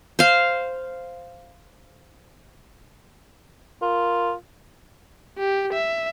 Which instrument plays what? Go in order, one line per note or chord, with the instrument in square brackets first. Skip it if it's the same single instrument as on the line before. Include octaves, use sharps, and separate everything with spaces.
[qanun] C5 F5
[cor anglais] F4 [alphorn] A#4
[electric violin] G4
E5